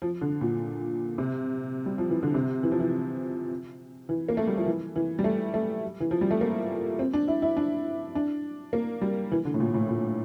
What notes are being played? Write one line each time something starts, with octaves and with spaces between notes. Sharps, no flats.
F3
D3
A#2
C3
G3
F3
E3
D3
C3
E3
F3
E3
E3
A#3
A3
G3
F3
E3
E3
G3
A3
A3
E3
F3
G3
A3
A#3
C4
D4
E4
E4
D4
D4
A#3
G3
E3
D3
A2
A#2
A2
A#2